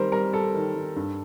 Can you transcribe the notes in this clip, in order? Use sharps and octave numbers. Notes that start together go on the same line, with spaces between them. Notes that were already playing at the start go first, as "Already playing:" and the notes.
Already playing: D#3 G3 A#4 C5
G3 A#4
G3 A4
D#3
D#3
G2